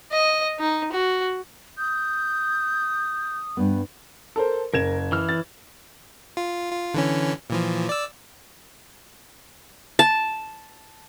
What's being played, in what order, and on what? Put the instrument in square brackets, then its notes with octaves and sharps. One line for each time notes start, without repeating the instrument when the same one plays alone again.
[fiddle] D#5
D#4
F#4
[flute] D#6 [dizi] G6
[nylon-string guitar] G2 B3
[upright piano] A4 A#4 C5
[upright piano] F#1 G#6 E7 [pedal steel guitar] A#4
[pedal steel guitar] E3 F6
[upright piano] A6
[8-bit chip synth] F4
F4
D3 E3 C#4
A#2 E3 F3
D5 E6
[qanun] A5